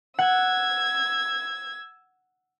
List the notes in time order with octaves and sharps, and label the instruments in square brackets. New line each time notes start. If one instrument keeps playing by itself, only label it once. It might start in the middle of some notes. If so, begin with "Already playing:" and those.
[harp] F#5 [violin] E6 G#6